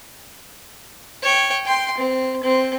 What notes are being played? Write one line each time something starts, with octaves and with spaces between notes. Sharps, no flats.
C#5 G5
G5 C6
C4
C4